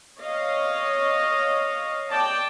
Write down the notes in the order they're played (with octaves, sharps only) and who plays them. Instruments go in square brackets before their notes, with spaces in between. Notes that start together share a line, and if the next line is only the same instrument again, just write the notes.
[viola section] C#5 D#5 F5
D5 G5 A5